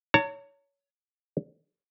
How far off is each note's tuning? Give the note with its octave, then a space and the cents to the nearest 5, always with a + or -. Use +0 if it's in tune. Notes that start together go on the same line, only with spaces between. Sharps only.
C#5 +20 A#5 -45